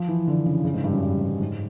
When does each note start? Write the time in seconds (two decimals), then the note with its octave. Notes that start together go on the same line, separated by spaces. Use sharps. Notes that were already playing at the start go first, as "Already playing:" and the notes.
Already playing: F3
0.08 E3
0.28 D3
0.46 C#3
0.65 C#3
0.74 G#2
0.84 G2
0.93 F#2
1.03 G2
1.21 G#2
1.40 G#2